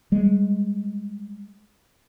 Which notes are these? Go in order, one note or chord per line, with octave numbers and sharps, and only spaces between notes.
G3 G#3